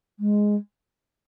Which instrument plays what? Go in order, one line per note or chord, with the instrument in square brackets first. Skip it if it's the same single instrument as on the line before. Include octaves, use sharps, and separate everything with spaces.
[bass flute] G#3